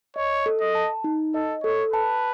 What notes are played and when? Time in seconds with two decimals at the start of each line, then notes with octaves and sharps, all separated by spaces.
0.16 C#5 D#5
0.46 A4
0.60 D#5
0.75 A5
1.04 D#4
1.34 A4 D#5
1.63 A4 C#5
1.93 B4 A5